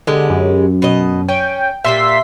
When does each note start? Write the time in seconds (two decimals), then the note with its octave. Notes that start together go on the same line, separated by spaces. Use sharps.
0.07 D3 G#3 B3 G4
0.30 F#2
0.82 B2 D#5
1.28 C#4 G5
1.84 A#2 G3 A#3 E5 C6 B6